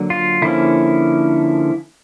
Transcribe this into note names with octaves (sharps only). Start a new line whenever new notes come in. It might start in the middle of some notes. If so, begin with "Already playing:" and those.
Already playing: D3 F#3 A#3
F4
D3 F3 A#3 C#4 E4